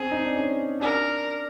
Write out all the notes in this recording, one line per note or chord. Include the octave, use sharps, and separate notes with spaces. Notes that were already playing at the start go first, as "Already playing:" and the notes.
Already playing: C4 G#4
D#4
D4
C#4
D4 A#4